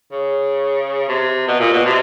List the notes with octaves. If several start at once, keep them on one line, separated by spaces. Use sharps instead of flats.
C#3
C3
B2
A#2
B2
C3